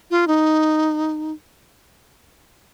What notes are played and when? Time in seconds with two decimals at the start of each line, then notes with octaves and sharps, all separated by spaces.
0.11 F4
0.28 D#4